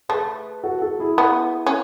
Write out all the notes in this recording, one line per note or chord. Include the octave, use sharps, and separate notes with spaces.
A3 G#4 B4
F#4 A4
F#4 A4
E4 G#4
B3
C#4